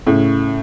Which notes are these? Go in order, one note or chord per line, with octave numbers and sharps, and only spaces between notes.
A2 C#3